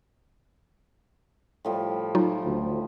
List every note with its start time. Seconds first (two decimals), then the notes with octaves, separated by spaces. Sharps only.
1.65 A2 F3 G3
2.15 F#3 D#4 F4
2.45 D2